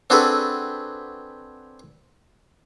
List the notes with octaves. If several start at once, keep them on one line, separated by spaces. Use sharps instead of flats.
C4 D4 F#4 G#4 A4 B4